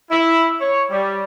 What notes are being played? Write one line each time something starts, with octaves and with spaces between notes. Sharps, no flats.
E4
C#5
G3